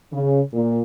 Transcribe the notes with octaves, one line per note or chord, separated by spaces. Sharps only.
C#3
A#2